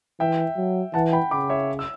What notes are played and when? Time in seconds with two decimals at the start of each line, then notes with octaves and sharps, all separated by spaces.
0.20 E3 E5 G5
0.57 F#3
0.94 E3 F#5 A5
1.12 G5 B5
1.31 C#3 B5 D6
1.49 C#5 E5
1.79 E6